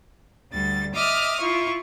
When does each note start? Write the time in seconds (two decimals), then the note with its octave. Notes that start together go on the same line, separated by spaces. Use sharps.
0.52 D2 G3 A6
0.94 D#5 E5 D6 D#6 F6
1.40 E4 F4 C#6